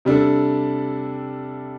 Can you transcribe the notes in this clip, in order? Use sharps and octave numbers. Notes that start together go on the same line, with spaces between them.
C3 G3 D4 A4